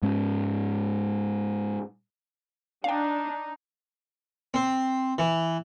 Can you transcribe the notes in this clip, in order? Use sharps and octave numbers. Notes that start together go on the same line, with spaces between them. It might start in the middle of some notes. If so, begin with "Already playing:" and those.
G#2 G#3 C#4
D4 D#4 F5 G5
C4
E3